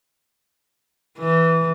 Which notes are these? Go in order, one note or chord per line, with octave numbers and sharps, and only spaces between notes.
E3